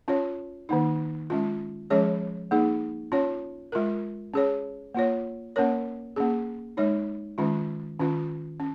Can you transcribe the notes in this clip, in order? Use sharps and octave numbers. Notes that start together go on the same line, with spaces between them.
C#4 F4 C#5
D#3 A#3 D#4
G#3 C#4 F4
F3 G#3 C#4 G#4 C#5
A#3 D#4 G#4
C#4 F4 C#5
G#3 F4 A#4
C#4 G#4 C#5
A#3 F4 C#5
A#3 C#4 A#4 C#5
A#3 C#4 G#4
G#3 D#4 C#5
D#3 G#3 C#4 F4
D#3 C#4 F4
C#4